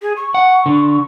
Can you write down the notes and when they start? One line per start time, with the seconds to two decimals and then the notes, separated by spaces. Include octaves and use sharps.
0.02 G#4
0.17 C#6
0.34 F#5
0.66 D3